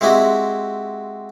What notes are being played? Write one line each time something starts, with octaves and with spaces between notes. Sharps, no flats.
G#3 C4 E4 F#4 G4